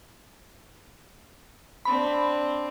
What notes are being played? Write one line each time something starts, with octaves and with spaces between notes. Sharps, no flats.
C4 D4 B5